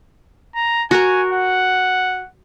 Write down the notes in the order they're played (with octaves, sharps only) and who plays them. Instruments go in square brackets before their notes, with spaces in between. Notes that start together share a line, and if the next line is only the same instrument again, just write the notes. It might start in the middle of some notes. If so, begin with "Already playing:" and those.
[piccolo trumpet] A#5
[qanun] F#4 A#4 [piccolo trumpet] G#5
[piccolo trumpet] F#5